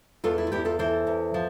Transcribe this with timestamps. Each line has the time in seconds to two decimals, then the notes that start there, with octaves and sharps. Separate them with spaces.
0.24 E2 F4 A4
0.38 E4
0.47 F4
0.52 E2 E4 G4
0.65 F4 A4
0.79 E3 A4 C5
1.07 E2
1.34 F3